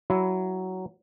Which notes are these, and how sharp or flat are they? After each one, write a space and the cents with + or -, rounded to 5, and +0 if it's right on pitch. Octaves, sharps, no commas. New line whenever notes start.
F#3 +10 E4 +0